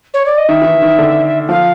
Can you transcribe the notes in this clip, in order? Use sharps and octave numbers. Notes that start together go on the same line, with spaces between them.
C#5
D5
D#5
D#3 E5
E3
D#3
D#3
D3
F3 F5